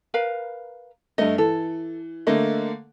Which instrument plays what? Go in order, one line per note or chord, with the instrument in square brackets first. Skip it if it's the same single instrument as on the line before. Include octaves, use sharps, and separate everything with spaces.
[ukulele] A#4 B4 F5
[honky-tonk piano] G2 A3 [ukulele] D#5
[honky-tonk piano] E3 [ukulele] A4
[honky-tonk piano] D3 A3 A#3 [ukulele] D#5